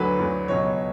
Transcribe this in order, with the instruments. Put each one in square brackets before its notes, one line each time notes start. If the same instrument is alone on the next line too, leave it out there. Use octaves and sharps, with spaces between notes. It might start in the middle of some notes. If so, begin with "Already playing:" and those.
Already playing: [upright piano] D2 D3 F#3 B4
D2 D3 F#3
C#2 B2 F#3 C#5